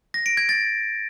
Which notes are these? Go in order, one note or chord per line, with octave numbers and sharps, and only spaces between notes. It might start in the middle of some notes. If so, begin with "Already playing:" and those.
A#6
D7
G#6
A6